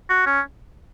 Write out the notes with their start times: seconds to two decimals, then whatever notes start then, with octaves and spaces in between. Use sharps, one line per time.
0.10 F#4
0.26 C#4